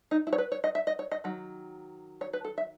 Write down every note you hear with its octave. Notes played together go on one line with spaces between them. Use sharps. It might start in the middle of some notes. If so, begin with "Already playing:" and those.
D#4
E4
C#5
B4
C#5
D#5
E5
D#5
C#5
D#5
D#3 F#3
C#5
B4
A4
E5